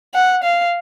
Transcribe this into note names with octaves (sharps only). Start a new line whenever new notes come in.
F#5
F5